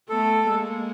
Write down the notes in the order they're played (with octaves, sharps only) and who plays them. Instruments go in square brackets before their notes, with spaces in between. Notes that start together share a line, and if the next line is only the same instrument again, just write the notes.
[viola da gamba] A3 B3 [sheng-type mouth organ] A4
[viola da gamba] G#3 A#3